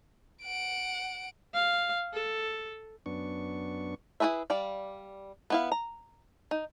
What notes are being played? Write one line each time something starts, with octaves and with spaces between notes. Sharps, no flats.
F#5 D7
F5
A4
F#2 B3 D4 C#6
E4 F#4 G#4 B4 E5
G3 D5 F5
B3 E4 F5
A#5
D#4